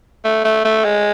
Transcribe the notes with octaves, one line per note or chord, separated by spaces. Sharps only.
A3
A3
A3
G#3